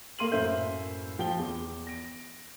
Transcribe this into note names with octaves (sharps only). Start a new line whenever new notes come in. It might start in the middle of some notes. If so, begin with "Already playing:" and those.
A3 A#3 C6 D#7 F#7
F#2 A2 A#3 C5 E5 G6
F3 G5 G7
E2
A#6 D7